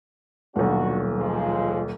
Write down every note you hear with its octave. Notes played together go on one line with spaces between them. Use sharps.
D#1 B1 F#3 D4 F#4
F3 G#3